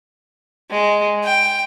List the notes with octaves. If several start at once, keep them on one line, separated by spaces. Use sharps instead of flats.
G#3
G5